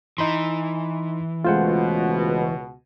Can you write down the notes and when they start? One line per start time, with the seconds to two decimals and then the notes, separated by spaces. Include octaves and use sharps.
0.18 E3 D#4 B5 C6
1.45 C#2 B2 G#3 A3 F4 C5 F#5